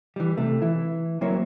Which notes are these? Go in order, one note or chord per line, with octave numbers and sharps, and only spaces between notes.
E3 G3
C3 A3
E3 E4
F#3 A#3 C4 E4 C#5